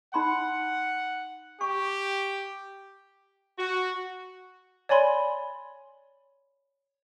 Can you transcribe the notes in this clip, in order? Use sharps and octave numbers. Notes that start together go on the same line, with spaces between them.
D#4 F#5 B5 C6
G4 C#6
F#4
C#5 D5 G#5 B5 C6